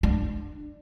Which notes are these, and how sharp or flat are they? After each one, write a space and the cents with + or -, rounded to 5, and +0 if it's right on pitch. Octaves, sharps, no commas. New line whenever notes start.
D4 +20